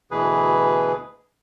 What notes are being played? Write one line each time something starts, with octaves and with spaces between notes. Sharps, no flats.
D2 B2 E3 G#4 B4